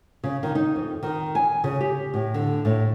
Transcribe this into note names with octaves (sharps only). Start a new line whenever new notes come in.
C#3
D#3
D#4
F2
D#3
G#5
C#3
G4
A2
D3
A2